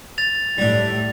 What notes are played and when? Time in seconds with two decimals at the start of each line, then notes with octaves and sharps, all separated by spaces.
0.18 A6 F7
0.58 A2 G3 A3 D4